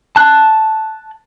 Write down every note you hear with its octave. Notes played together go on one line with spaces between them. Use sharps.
A5 F#6